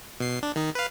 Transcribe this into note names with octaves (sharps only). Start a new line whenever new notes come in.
B2 C7
D4
D#3 D#4
B4 F5